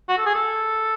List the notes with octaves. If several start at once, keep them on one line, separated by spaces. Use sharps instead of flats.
F#4
A4
G#4
A4